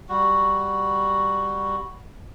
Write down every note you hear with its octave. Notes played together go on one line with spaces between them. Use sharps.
G3 F#4